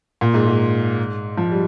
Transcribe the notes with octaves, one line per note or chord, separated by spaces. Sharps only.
A#2
G#2
G#2
F3
G3